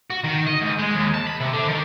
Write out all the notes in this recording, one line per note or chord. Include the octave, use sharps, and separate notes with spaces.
F#4
D#3
D#5
G#2
G#3
D#2
A5
B5
C3
D3
D#3